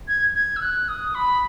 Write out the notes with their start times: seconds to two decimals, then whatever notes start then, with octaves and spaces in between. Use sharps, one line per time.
0.08 G#6
0.35 G#6
0.56 E6
0.61 F#6
0.88 D#6
1.15 B5